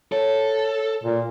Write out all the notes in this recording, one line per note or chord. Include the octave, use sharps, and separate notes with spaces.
A4 C#5
A#2